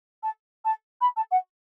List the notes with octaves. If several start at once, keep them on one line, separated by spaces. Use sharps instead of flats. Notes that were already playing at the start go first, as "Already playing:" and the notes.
A5
A5
B5
A5
F#5